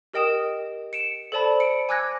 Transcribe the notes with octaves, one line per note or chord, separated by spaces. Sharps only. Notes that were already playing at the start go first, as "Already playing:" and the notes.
G4 A#4 D#5 G5 D#6 E7
C#7 D7 E7
A4 C5 D5 A5 B5
C#7 D7
G#5 D6 E6 F#6 G#6 A#6